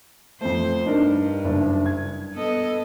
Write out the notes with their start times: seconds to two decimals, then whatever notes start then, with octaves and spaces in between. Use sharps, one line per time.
0.41 F2 A3 C5
0.86 G2 D4 D#4 A#4
1.44 F#1 D4
1.86 G#6
2.34 B3 A4 D#5